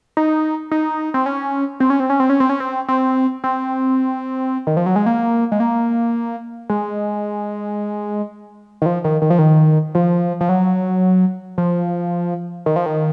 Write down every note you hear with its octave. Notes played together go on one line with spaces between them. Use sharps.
D#4
D#4
C4
C#4
C4
C#4
C4
C#4
C4
C#4
C4
C#4
C4
C4
C4
D#3
F3
F#3
G#3
A#3
G#3
A#3
G#3
D#3
F3
D#3
D#3
F3
D#3
F3
F3
F#3
F3
D#3
F3
D#3